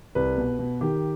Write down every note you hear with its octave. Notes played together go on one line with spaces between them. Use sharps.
C2 B4
B2
B2
D#3 G4